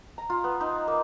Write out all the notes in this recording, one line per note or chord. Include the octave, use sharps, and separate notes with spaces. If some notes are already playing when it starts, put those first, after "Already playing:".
A#5
F4
B3
D#4
A#3